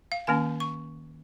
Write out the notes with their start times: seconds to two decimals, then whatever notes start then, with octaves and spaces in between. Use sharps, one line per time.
0.12 F5
0.27 D#3 A#3 C#4 G#5
0.60 C#6